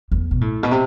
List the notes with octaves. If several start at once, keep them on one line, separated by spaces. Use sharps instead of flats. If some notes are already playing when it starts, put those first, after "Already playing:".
E2
B2
A2
B2
C3